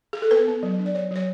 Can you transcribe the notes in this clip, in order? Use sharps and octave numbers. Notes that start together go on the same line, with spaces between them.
G#4
A4
B3 B4
B3
F#3
D4
D5
F#3 C#5
F#3 C#5